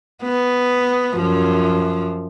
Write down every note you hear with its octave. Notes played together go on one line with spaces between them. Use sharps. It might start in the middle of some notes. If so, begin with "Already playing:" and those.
B3
F#2 F3